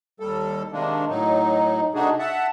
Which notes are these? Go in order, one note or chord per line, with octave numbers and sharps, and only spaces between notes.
D#2 G3 A4
C3 D#3 G#3 A#3 D4
A2 F#3 D#4
C3 A3 D4 D#4 F#4 G#4
E5 F#5 A5